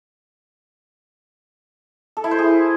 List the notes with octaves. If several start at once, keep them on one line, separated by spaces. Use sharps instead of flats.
A4
E4
C5
G#4